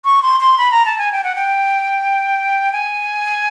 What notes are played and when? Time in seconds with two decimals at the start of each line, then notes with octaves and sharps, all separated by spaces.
0.05 C#6
0.22 C6
0.40 C6
0.58 B5
0.72 A#5
0.86 A5
0.98 G#5
1.12 G5
1.24 F#5
1.35 G5
2.73 G#5